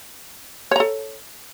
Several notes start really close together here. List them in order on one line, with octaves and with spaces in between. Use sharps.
C#5 A#5 A4